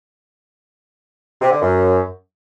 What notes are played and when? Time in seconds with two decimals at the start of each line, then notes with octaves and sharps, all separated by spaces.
1.41 C3
1.51 D3
1.61 F#2